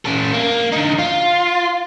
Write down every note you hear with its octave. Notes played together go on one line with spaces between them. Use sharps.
C#4 A4
A#3
D3 D#4
F4